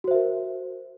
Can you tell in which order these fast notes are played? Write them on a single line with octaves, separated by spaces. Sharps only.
F#4 C5 E5 A#4